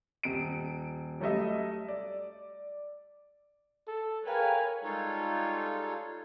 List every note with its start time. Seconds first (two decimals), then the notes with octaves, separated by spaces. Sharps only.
0.23 D#1 D7
1.20 F#3 G3 A3 D#5 E5
1.88 D5
3.88 A4
4.26 G#4 A#4 B4 C#5 F5 G5 G#5
4.83 G3 G#3 D#4 F4 A4 C#5